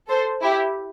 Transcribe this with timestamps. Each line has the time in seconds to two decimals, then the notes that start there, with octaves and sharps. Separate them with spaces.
0.08 A4 C5
0.42 E4 G4